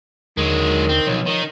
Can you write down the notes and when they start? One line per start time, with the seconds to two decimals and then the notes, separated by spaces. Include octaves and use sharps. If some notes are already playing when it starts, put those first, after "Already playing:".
0.37 D#2 D3 D#3 F#3 G#3
0.89 C4
1.07 B1 F3 C#5
1.26 D#3 D#4